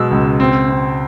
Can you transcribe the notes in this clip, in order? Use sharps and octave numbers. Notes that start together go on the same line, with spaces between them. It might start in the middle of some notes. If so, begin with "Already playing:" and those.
Already playing: B2 F#3 G#3 E6
C#2
C4
C4